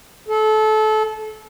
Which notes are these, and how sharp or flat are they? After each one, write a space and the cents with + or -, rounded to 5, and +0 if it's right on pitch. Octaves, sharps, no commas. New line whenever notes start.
A4 -25